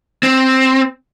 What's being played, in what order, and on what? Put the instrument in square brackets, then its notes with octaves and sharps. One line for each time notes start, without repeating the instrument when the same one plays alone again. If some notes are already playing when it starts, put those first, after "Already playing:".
[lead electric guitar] C4